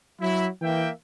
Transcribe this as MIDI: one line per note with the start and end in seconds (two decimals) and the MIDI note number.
0.21 0.48 54
0.21 0.48 64
0.62 0.89 52
0.62 0.89 58
0.62 0.89 76
0.62 0.89 79